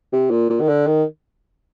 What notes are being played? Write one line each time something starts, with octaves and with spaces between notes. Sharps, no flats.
C3
A#2
A#2
D#3
D3
D#3